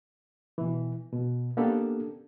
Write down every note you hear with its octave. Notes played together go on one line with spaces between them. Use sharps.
B2 E3
B2
A#3 B3 C#4 D4 G4 A4